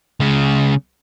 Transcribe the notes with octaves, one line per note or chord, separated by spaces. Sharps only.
C#2 C#3